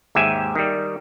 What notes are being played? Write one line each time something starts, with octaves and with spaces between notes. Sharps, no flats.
D#2 G#2 G4 E5 G#5
D#3 G3